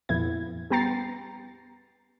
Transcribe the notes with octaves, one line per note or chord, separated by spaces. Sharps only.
F2 A#2 B3 E4 G#6
G3 B3 G5 A#5 A6 C7